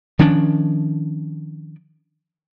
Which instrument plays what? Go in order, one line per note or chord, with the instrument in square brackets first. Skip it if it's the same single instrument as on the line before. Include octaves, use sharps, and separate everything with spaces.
[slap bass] D#3 F3 C#4 D4